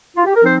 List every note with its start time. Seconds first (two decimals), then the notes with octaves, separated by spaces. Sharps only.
0.16 F4
0.25 G4
0.35 A#4
0.42 F3 C4 D#4 C5